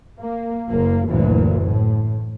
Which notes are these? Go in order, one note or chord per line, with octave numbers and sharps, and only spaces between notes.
A#3
F#1 A#3
F#1 D2 A#2 E3
A2